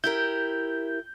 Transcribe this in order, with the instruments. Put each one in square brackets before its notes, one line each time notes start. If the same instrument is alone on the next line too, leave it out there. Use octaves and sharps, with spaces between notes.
[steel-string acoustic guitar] E4 G4 A#4 [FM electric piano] G6